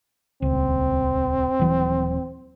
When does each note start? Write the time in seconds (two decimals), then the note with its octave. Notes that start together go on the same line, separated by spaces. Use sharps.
0.42 D#1 C#2 C4
1.59 D#1 E3 F#3